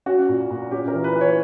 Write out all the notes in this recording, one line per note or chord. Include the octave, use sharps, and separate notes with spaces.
C#4 F#4
A#2
A#2
C#4 G4
A#4
E3
B4
E3
C#5